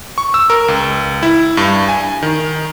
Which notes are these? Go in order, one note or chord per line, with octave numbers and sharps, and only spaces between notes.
C#6
E6
A#4
C#2
E4
G2
G#5
D#3